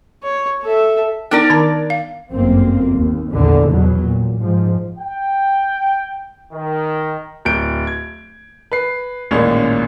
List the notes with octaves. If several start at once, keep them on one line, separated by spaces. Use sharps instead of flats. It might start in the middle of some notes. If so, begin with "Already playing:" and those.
C#5
A4 E5
B3 D4 D#4 A#4 D5
D#3 A5 A#5
F5
G1 F#2 A#3 C4
D#2
A#1 E2 D3
E2 B2 F#3
A#2
G#2 F3
G5
D#3
D1 G6 D7
G#6
B4 C7
A1 D#2 A#2 G#3 C#4